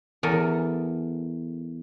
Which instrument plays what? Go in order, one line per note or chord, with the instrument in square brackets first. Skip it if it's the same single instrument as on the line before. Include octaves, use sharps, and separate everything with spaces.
[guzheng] E2 A4 A#4 G#5